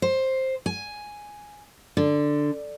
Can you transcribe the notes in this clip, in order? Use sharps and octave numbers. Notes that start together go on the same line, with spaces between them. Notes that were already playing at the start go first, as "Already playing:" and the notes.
C5
G#5
D3